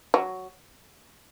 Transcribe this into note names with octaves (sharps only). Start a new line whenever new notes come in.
F#3